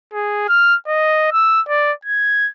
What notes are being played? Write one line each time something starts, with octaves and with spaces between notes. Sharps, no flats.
G#4
F6
D#5
E6
D5
G#6